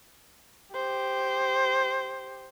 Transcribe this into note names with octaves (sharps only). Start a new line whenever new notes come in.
G4 C5